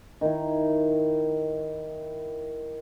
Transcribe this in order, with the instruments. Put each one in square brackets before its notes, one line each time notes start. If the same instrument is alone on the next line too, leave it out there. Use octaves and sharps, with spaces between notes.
[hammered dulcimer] D#3 E4